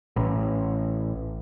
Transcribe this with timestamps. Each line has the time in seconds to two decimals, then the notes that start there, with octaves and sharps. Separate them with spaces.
0.16 A1